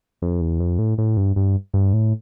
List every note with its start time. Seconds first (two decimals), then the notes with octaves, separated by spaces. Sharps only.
0.22 F2
0.41 E2
0.60 F2
0.79 A2
0.98 A2
1.17 G2
1.36 G2
1.74 G2
1.93 A2